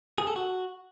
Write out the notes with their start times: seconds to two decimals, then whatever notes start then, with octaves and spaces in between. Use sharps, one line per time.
0.18 G#4
0.27 A4
0.36 F#4